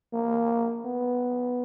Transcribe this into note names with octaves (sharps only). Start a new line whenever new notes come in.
A#3
B3